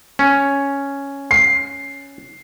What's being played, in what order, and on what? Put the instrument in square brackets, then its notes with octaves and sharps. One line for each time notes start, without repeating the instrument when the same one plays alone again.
[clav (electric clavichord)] C#4
[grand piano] C7